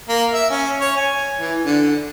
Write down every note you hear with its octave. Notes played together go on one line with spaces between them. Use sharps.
A#3
E5
C#4
C#5
G#5
E3
D3